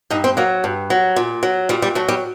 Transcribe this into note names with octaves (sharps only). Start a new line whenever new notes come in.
G2 D#4
C4
F#3 A#3
G2
F#3
A#2
F#3
A#2 G3
G3
F#3 A3
G3